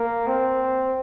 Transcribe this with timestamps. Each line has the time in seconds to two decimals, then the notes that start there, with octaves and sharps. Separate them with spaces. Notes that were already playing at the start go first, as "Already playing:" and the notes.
Already playing: A#3
0.27 C4